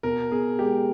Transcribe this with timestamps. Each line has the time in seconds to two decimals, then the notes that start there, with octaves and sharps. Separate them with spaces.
0.03 B2 A#4
0.32 B2 G#4
0.59 G#3 G4